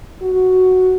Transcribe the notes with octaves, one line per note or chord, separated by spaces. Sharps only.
F#4